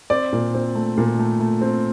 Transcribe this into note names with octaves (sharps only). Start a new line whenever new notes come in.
C4 D5
A#2
C4
A3
A#2
A3
A3
C4